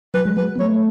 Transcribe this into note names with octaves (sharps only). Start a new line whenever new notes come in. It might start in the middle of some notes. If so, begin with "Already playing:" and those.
F#3 B4
G#3
F#3 B4
B3
A3 C#5